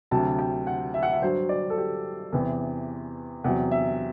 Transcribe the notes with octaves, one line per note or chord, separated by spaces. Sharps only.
D2 C3 F#3 A5
G5
F#5
E5
F#5
E5
G2 F#3 C5
D5
A4
G4
E2 C3 E3
E2 C3 F#3 F#5
E5